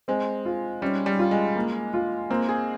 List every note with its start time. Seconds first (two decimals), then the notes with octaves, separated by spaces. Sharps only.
0.08 G#3 C4
0.45 F4
0.82 G3 C#4
1.06 G3
1.19 F4
1.31 G#3
1.56 A#3
1.94 F4
2.30 A#3 C4
2.49 G#4